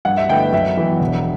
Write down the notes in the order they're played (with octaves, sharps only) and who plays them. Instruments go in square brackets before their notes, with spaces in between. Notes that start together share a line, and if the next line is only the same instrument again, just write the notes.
[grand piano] G2 [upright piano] F#5
[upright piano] E5
[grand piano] D3 A3 E4 B4 [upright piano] G5
[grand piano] F#2 [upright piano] E5
[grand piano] E3 B3
E1